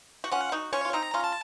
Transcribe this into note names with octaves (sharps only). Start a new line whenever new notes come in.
F#4
C#4 F4 F#5
D#4 F#4
C#4 F4 C#5
F4
C4 D#4 A#5
C#4 F4
A5